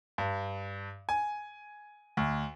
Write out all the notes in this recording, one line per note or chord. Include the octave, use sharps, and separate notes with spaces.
G2
G#5
D2